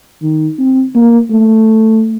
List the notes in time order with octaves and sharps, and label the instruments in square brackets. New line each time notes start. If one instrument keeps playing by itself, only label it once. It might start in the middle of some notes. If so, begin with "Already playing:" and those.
[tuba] D#3
C4
A#3
A3